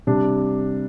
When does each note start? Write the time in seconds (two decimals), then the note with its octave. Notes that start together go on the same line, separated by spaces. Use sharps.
0.07 C3 G3 D4